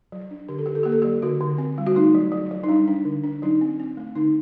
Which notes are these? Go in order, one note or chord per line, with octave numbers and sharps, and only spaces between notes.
F#3
D4
D3 G4
A4
D3 G4
A4
A#3 G4
A4
G4
F#3
D3 F#4
D3
C4
G3
F#4
A3 D#4
F#3
F#3
F#3
D#4
G3 D4
D4
D3
D4
F#3 D#4
C4
C4
A3
D3 D#4